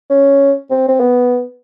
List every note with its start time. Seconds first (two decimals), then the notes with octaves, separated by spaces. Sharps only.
0.10 C#4
0.71 C4
0.88 C4
1.00 B3